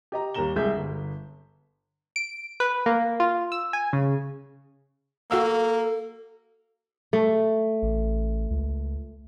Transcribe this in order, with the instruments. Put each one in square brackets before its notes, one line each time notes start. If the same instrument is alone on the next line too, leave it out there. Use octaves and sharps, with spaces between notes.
[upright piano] G4 D#5 A#5
D#2 G3 A#3 A#5 E7 G7
C2 G#3 G#4 E5 G6 B6
G1
[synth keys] D7
B4
A#3
F4
E6
G#5
C#3
[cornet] A#3 [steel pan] F#4 F5 E6 [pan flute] A4
[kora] A3
[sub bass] A1
C#2